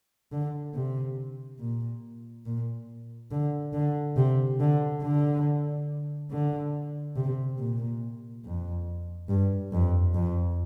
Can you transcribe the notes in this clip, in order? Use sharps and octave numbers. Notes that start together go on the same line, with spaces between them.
D3
C3
A#2
A#2
D3
D3
C3
D3
D3
D3
C3
A#2
F2
G2
F2
F2